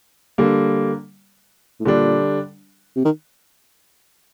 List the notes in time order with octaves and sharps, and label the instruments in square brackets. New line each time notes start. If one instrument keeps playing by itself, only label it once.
[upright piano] D3 G3 A#3
[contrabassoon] A2
[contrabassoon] A#2 [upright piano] D3 G3 D4
[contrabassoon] C3
D#3